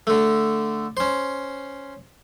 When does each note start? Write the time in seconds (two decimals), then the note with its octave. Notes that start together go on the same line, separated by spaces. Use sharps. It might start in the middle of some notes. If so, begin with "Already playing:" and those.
0.07 D3 A3
0.97 C#4 C5